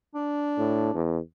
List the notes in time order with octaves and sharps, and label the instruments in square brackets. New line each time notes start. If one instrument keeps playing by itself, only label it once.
[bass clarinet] D4
[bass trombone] A2
E2